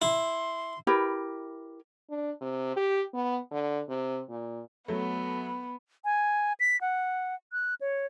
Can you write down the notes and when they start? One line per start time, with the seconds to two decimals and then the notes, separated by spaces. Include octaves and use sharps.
0.02 E4 C6
0.87 E4 G4 A#4 B4
2.10 D4
2.41 C3
2.76 G4
3.14 B3
3.51 D3
3.89 C3
4.30 A#2
4.88 F#3 A3 B3
6.05 G#5
6.60 B6
6.81 F#5
7.52 F#6
7.81 C#5